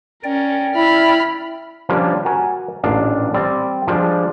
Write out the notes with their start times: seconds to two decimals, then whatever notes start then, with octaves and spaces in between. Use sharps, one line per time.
0.24 C#4 A#4 D5 G5
0.76 E4 B5 F6
1.89 F3 G3 A#3 C#4 D4
2.25 F#4 A#4 G#5
2.83 A1 A#2 D4 F5
3.34 G3 C4 D5
3.88 F3 G3 G#3 D4